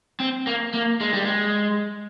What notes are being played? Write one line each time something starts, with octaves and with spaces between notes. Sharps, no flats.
C4
A#3
A#3
G#3
G3
G#3